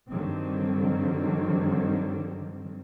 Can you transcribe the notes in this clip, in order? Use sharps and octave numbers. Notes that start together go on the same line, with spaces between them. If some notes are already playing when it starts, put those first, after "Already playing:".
G2 D3 D#3 F#3 G3 C4